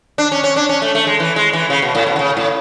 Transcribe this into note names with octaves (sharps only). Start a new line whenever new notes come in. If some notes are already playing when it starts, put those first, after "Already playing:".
D4
C#4
C#4
D4
C#4
A3
A3
G#3
E3
G#3
E3
C#3
B2
A2
B2
D3
C#3
A2